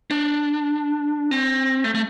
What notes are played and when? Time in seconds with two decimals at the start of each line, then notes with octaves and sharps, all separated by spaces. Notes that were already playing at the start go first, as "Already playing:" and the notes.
0.11 D4
1.31 C4
1.84 A3
1.95 A3